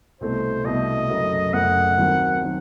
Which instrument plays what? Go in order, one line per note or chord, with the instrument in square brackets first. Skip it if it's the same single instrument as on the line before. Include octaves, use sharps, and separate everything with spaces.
[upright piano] C2 B2 A3 [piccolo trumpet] C5
[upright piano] C2 B2 A3 [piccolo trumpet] D#5
[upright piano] F#1 F#2 F#3 A3
[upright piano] F#1 F#2 F#3 A3 [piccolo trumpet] F#5
[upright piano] D#2 D#3 F#3 C4
D#3 F#3